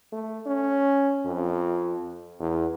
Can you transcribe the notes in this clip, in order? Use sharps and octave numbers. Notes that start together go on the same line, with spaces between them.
A3
C#4
F2
E2